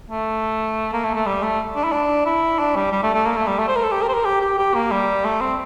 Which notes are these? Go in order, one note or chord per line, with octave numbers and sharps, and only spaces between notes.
A3
A#3
A3
A3
G3
A3
D4
E4
D4
E4
D4
G3
G3
A3
A3
A#3
A3
G3
A3
C5
A#4
A4
G4
A#4
C5
A#4
G4
G4
G4
A#3
G3
A3
C4